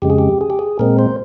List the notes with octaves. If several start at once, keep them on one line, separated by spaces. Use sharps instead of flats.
F2 C#3 G#3 G4
G#4
G4
G#4
G4
G#4
A#2 G#3 C4 A#4
C5